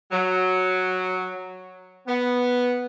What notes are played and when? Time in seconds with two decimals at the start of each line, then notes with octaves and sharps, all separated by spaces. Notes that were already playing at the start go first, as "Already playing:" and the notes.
0.11 F#3
2.07 B3